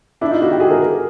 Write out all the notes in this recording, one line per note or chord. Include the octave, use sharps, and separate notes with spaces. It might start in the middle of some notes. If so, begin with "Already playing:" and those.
D4 E4
D#4 F4
E4 F#4
F4 G4
F#4 G#4
G#4 A#4